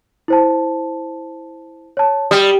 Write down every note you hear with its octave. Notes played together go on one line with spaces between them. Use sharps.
E4 C5 A5
C#5 A5
G3 D#6